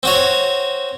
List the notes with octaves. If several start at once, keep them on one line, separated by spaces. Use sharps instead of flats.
C4 F#4 C#5